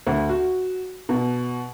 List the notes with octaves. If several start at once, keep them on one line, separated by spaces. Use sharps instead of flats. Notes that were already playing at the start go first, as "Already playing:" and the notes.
D2
F#4
B2